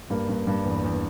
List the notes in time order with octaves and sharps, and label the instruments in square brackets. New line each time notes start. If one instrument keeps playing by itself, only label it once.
[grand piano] G2 A#3 A#4
G2
G2
E2
E2